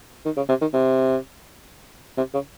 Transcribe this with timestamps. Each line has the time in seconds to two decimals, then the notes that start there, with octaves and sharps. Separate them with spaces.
0.25 D#3
0.37 C#3
0.49 C3
0.61 D#3
0.73 C3
2.17 C3
2.34 C#3